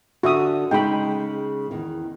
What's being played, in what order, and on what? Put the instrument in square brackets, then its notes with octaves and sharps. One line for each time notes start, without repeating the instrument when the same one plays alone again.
[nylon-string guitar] D3 [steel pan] F#4 E5 D#6
[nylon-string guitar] C#3 G#3 D#4 [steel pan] G5 B5
[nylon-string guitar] E2 D#3